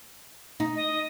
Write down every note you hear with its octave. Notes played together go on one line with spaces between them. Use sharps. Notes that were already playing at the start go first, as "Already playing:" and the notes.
D#4
D#5